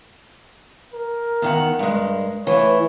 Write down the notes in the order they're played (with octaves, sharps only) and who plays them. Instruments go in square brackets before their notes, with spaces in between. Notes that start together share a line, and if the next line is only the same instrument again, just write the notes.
[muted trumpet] A#4
[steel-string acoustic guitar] E2 D#3 F#5
G2 G#3
[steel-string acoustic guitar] E3 A3 [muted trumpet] C#5